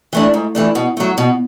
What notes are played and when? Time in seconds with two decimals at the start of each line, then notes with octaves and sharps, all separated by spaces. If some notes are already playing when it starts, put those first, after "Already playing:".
0.13 E3 A3 D4
0.34 G#2
0.55 E3 A3 D4
0.75 B2
0.97 F#3 A3
1.18 B2